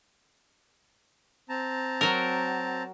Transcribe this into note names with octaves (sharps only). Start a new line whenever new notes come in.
C4 A5 A#5
F#3 A#4